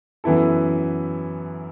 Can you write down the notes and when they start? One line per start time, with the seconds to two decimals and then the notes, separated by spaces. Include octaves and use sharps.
0.24 F#2 E3 B3 E4 A4